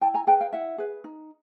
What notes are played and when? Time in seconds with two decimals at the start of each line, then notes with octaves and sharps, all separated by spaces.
0.01 E4 G5 A5
0.14 G#5 A#5
0.27 G#4 B4 G5 A5
0.40 F5 G5
0.53 E4 E5 F#5
0.78 G#4 B4
1.04 D#4